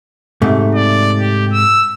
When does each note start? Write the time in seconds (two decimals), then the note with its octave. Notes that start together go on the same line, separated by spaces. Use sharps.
0.42 G#2 C3 A3
0.75 D5
1.19 G4
1.53 E6